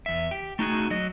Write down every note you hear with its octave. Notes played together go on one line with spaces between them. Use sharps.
E2 E5
G4
A3 D#4 F#4 G#4
F#3 D#5